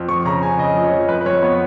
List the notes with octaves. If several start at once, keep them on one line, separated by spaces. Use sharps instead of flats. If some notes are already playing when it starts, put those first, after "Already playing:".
Already playing: F2
F3 C#6
C#3 A#5
C#3 G#5
C#3 D#5
F3 D#5
C#5
F3
F2 B4
B4
F2 C#5
B3 C#5